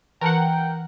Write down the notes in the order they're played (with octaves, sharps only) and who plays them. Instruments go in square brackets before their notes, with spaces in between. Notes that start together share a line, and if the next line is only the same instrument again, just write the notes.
[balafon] E3 B4 A5 [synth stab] A#4 F#5 [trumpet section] G5